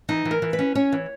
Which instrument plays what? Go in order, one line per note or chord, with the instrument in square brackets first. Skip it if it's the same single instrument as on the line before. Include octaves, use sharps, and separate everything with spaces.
[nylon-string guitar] E3 D#4
E3
A#4
E3
B4
C#4
C#4 C#5
E3